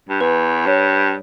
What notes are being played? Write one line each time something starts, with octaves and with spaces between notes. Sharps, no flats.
G2
E2 B4
G2 C#5